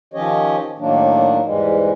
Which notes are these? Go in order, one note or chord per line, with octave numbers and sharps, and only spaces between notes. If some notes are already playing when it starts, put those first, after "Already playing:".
D#3 F3 C#4 G4 C#5 D#5
A2 D#3 F#3 A#3 D4
E2 G#2 E3 G3 G#3